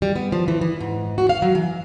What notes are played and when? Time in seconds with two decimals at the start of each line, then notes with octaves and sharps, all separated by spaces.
0.02 G3
0.15 B3
0.32 F3
0.48 E3
0.61 E3
0.80 G#2
1.18 F#4
1.29 F5
1.42 F#3
1.55 E3